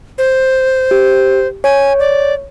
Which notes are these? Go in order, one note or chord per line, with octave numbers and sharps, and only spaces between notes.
C5
G4
C#5 G#5
D5